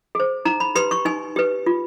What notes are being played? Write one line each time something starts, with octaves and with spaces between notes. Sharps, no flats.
G#4 C5
D#4 A#5
B5
G4 B4 C6
C#6
D#4 G#5
G4 B4
F4